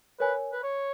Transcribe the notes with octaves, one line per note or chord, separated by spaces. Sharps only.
A#4 B4 C#5 G#5
B4
C#5